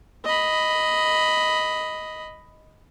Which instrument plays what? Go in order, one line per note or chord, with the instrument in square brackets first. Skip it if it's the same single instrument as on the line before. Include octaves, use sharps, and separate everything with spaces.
[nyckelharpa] D#5 B5